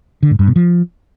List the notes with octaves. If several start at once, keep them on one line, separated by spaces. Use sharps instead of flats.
D3
G#2
G2
B2
F3